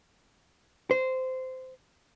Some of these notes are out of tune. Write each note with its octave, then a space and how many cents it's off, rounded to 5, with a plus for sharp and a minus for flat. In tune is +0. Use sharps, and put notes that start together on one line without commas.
C5 -15